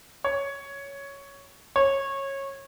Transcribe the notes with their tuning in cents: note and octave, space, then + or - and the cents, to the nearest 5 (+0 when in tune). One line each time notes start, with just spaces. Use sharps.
C#5 +10
C#5 -15